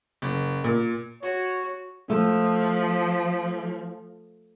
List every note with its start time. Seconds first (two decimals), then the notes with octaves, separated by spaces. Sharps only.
0.22 F#1
0.64 A#2
1.23 F#4 C#5
2.10 F3 A3